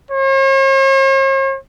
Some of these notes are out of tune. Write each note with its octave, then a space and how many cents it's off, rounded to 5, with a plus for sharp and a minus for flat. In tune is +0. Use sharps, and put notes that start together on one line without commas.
C#5 -45